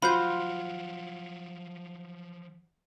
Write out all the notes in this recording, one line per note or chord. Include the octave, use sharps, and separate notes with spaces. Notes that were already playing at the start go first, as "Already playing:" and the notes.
F3 F#3 F4 F#4 C5 B5 G6